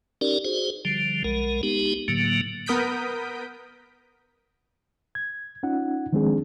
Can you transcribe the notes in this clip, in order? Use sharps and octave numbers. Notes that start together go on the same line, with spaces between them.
C#4 D#4 G4 A#4 D5
F#4 G#4 C5
D3 F3 G3
B1 G#3 A#4
G#3 B3 D#4 G4
A2 D3 F#3 A#3
B3 A#4 D#6 G6 B6 D7
G#6
C#4 D#4 F4 F#5
D#3 F3 G#3 C4 D4 G#4